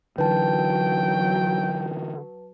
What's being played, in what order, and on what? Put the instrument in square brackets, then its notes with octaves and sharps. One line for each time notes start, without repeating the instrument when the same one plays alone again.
[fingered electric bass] D3 E3 [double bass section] F#3 [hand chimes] B4 A5 [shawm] G5